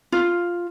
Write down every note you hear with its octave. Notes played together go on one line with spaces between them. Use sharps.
F4